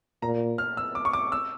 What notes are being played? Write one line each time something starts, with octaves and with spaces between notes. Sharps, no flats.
A#2 A#5
F6
E6
D6
C#6
D6
E6